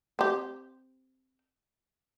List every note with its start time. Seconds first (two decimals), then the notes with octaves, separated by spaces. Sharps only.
0.19 C4 G4